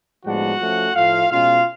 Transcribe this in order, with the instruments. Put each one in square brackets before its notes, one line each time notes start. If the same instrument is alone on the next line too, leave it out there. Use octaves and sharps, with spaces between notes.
[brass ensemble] A2 F3 G#3 B3 D4 F#4 F#5
F3 A3 C#4
A2 F3 A3 F4 F5
B2 G#3 C#4 F4 F5